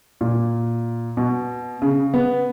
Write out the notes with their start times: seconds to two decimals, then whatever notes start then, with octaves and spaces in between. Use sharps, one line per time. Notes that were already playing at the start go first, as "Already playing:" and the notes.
0.21 A#2
1.17 B2
1.82 C#3
2.14 B3